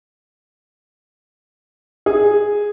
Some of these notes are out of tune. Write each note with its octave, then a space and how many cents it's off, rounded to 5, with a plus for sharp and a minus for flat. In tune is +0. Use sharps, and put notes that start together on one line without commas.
G#4 -5